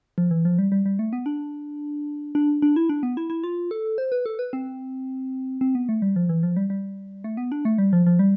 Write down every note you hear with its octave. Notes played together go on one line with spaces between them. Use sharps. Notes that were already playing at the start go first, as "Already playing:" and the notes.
F3
E3
F3
G3
G3
G3
A3
B3
D4
D4
D4
E4
D4
B3
E4
E4
F4
A4
C5
B4
A4
B4
C4
C4
B3
A3
G3
F3
E3
F3
G3
G3
A3
B3
D4
A3
G3
F3
F3
G3